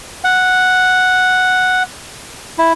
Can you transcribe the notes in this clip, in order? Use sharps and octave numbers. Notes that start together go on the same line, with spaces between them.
F#5
E4